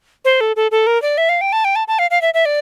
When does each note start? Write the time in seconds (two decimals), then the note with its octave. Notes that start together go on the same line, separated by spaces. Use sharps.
0.25 C5
0.41 A4
0.56 A4
0.71 A4
0.87 A#4
1.02 D5
1.18 E5
1.29 F5
1.41 G5
1.52 A5
1.65 G5
1.76 A5
1.88 A5
1.99 F5
2.11 F5
2.22 E5
2.34 E5
2.45 D5